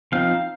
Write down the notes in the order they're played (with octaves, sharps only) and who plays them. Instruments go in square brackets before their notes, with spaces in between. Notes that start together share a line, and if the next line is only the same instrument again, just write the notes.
[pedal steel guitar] F3 C4 D#4 F5